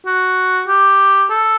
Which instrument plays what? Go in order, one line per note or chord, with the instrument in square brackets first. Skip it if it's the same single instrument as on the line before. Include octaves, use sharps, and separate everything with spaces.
[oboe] F#4
G4
A4